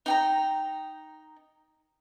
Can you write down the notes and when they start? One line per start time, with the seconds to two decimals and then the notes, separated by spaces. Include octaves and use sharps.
0.06 D#4 G5 A#5